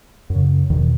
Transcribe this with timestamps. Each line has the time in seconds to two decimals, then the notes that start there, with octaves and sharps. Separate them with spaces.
0.30 F#2
0.35 C#3
0.70 E2 B2 D#3